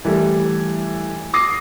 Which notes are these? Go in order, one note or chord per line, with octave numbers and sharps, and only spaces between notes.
E3 G3 A3
D6 D#6 A#6 C7